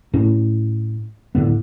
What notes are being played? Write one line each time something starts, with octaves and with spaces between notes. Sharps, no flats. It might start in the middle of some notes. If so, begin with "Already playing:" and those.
A2 C#4
D1 A2 D3 B3